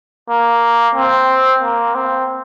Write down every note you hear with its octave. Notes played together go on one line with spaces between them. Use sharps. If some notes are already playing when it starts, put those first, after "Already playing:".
A#3
C4
A#3
C4